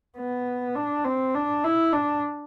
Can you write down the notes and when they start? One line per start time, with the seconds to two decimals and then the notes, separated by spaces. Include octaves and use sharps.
0.17 B3
0.75 D4
1.05 C4
1.35 D4
1.64 E4
1.93 D4